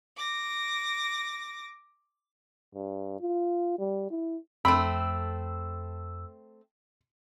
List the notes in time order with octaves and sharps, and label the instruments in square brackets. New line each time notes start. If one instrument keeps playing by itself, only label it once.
[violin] D6 A#6
[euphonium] G2
F4
G3
E4
[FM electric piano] F2 E6 [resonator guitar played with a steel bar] A3 C4 [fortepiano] B5